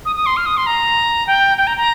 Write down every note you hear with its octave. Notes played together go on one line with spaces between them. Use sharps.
D#6
D#6
C6
F6
D#6
C6
A#5
G5
G5
A#5
A#5